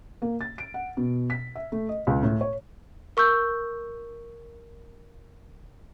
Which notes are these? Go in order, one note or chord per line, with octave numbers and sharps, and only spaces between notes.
A#3
A6
D7
F#5
B2
B6
E5
A3
D#5
C#2
A2
C#5
A#4 C#6 E6 G6